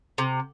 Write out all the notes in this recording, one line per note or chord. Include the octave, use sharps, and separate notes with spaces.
C3